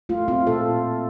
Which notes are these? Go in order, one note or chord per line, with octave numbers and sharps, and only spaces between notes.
A3 F4
C4 F4
A#2 A4